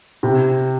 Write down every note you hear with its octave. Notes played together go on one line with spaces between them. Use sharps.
C3